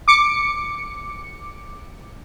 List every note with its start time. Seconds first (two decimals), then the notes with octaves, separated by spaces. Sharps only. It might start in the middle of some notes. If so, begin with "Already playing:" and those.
0.08 D6 C#7